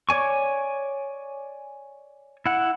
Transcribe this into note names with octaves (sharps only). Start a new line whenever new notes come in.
C#5 D5 G#5 C#6
E4 F#5